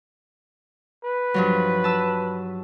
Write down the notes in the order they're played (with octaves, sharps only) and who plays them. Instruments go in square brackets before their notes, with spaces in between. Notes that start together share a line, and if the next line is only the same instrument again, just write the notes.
[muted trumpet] B4
[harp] G2 F3 F#3
A5 E6